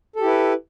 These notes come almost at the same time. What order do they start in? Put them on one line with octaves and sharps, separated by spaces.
A4 G4 E4 B4